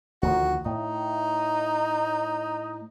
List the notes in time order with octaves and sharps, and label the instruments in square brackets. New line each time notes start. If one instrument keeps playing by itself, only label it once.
[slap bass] D2 D#3 F3 [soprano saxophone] F#4
[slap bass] A2 [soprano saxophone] D#4